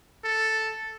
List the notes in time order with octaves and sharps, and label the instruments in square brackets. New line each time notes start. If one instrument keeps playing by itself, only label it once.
[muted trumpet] A4